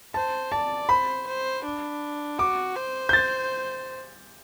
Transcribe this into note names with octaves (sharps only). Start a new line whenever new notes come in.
C5 A5
D5 A5
C5 B5
C5
D4
F#4 D6
C5
G6
A6